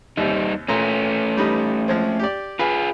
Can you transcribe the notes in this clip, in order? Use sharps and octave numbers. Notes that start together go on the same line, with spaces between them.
D#2 C3 G3 D#4
A#2 A3 C#4 A#5 C6
G3 D#4 B4
F3 G#3 C4
G4 D5
F4 G#4 B4 F5 G#5